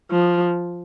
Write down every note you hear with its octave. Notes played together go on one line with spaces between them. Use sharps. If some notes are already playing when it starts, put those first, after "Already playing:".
F3